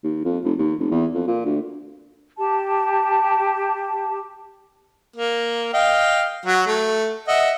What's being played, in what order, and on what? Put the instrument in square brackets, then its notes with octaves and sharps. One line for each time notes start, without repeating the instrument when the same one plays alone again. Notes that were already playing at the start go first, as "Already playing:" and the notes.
[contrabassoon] D#2
F2
F1
D#2
F1
E2
F2
A#2
D2
[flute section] G4 A5
[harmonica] A#3
D#5 F5 G5
F#3 F#4
A3
D#5 E5 F#5